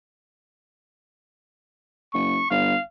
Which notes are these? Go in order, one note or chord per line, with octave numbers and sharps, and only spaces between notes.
F#1 C#6
G1 F5